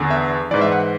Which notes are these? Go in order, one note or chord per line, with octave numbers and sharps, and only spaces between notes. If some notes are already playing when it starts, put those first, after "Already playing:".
Already playing: E2 D3
E5
G#2 E3 D5
E5
F#5